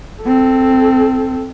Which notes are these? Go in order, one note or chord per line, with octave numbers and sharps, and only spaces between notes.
C4 A4